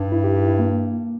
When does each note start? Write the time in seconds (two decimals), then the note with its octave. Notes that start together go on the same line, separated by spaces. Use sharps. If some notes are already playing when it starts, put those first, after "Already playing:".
Already playing: G2 D#4
0.12 E4
0.24 G4
0.36 G4
0.48 E4
0.59 A#3